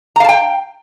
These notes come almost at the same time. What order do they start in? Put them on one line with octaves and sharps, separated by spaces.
A#5 F5 A5 G5